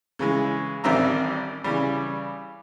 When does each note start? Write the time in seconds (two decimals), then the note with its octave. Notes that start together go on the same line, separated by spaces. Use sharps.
0.19 C#3 E3 G#3
0.84 A1 D#3 G3 C4 E5 A#5
1.64 C#3 E3 G3